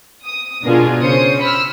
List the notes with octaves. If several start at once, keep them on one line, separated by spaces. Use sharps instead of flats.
D#6
B2 B3 D4 F4 G#4 A#4
C#3 C#4 C5 D#6 C#7
B5 E6 F6